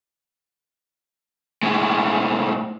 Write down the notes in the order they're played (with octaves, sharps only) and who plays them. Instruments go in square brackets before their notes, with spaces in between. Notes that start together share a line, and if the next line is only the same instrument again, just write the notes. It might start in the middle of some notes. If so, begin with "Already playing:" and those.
[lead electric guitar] A2 G#3